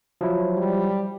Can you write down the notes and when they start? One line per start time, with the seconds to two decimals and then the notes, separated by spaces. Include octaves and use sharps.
0.21 F3 F#3 E4
0.57 G3